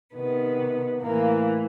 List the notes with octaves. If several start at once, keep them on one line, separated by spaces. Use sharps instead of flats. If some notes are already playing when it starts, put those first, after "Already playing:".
C3 D#3 B3
A2 E3 A#3